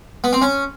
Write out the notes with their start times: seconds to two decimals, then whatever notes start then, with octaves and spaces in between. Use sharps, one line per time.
0.24 B3
0.33 C4
0.42 C#4